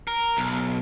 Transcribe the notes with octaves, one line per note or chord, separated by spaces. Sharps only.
A#4
B1